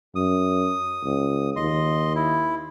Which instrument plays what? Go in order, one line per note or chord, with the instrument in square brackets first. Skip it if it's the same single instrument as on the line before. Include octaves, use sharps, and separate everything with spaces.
[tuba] F#2 [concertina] D#6
[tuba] C#2
[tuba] D#2 [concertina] D#5 C6
[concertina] E4